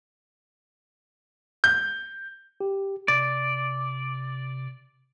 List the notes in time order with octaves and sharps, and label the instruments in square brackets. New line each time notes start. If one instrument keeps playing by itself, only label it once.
[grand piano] G6
[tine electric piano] G4
[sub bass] C3 [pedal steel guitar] D5